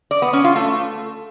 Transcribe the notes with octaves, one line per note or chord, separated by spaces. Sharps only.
D5
B3
C#4
F4
A3